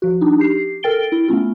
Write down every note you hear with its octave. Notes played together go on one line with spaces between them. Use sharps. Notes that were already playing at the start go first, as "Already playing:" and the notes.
F3 F#4
D4 D#4
G4 C7
A4 A#4 G5 A6 D7 G7
E4
A3 B3 C#4 F4